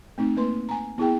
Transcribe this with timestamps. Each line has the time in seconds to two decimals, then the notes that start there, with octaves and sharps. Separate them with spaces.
0.18 A3 C4 D#4
0.37 A#3 B4 C6
0.69 G#5 A#5
0.98 B3 E4 G#4 G5